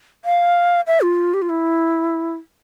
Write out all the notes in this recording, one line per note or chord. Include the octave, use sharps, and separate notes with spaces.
F5
E5
F4
G4
F4
E4